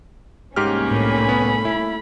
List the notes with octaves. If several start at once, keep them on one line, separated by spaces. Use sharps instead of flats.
C2 G#2 A#3 C#4 G4 F6
A2 A3 B5
B3
E4